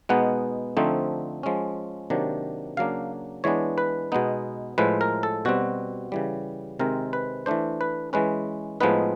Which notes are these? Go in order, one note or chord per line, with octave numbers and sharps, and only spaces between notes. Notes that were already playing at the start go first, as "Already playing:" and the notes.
B2 G#3 B3 D#4 F#5
D3 F3 A3 C4 D#4
F3 G#3 C#4
C3 D#3 F#3 A#3 D4
C#3 F#3 A#3 D4 F5
E3 G#3 B3 D4 C#5
B4
B2 G#3 B3 D#4
A2 F3 G#3 B4
A#4
A4
B2 G3 C4 F#4
C#3 E3 G3
C3 D#3 G#3 C4 A#4
B4
E3 A3 D4 C5
B4
E3 G#3 C#4 B4
A2 F3 G#3 B3 D#4 B4